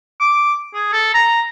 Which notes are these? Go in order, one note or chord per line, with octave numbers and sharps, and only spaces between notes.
D6
G#4
A4
A#5